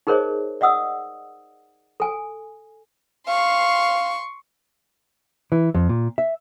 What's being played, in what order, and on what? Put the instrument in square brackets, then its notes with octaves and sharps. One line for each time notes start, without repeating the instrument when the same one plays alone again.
[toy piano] D#4 G#4 A#4 C5 C#5 D#5
D5 D#5 F#5 D#6 E6
A4 G#5
[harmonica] F5 [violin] C6 C#6
[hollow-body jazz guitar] E3
F2
A#2
E5